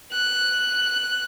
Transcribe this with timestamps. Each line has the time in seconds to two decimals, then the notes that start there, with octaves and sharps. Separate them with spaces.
0.12 F#6